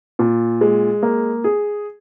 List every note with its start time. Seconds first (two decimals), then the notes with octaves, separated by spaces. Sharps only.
0.19 A#2
0.61 G#3
1.03 A#3
1.44 G#4